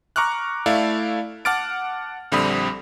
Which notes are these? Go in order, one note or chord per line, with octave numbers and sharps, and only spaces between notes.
A#5 C#6 D6 F6 F#6
A3 E4 A4 D5 F5
F#5 A5 D6 F6 A6 D7
A#1 D3 G3 C4 B5 D#6